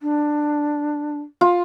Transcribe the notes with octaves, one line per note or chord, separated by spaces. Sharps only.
D4
F4